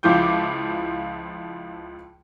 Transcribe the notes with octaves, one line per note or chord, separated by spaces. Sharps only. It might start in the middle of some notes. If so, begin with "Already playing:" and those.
C#2 F3 E4 F4 D6 G6